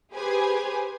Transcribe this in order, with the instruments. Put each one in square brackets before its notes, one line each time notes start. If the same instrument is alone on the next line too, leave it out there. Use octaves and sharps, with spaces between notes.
[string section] G4 G#4 B4 C5 G#5